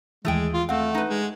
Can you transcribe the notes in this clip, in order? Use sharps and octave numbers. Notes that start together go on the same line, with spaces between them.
D#2 E3 G#3 A3 G#4 G5
F4
A3 C4 F5 F#5
D#4 B4
G#3